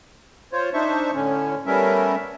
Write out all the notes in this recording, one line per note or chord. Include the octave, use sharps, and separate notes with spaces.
F4 C5 C#5
D4 D#4 C5 E5 C#6
A2 D3 C#4
G3 A3 B3 C#4 A#4 E5